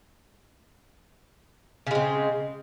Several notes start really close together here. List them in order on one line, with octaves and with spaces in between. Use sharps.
C#3 G#3 C4